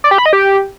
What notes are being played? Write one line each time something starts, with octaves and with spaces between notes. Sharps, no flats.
D5
G4
B5
D#5
G4